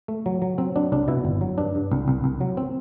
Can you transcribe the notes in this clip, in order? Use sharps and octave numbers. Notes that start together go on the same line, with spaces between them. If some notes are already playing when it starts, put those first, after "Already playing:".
A3
F#3
F#3
F#3 C4
F#3 D4
C2 D4
B2 E4
G1
F#3
G2 D4
G2
C2
C2
C2
F#3
C4